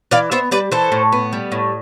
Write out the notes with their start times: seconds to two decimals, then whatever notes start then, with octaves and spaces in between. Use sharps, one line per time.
0.11 E3 D5 F5
0.31 B3 C5 E5
0.51 G3 B4 D5
0.71 E3 A4 C5
0.92 A2
1.12 B3
1.33 G3
1.52 A2